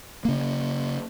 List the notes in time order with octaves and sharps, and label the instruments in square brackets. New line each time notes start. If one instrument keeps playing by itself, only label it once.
[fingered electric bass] C#3 A#3